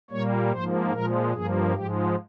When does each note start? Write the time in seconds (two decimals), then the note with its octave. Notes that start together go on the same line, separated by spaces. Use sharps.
0.11 A#2 G3 A#3 C#5
0.51 G#2 F3 A#3 C5
0.92 A#2 F3 G#3 A#4
1.33 G2 F3 A#3 G#4
1.74 G#2 F3 G#3 G4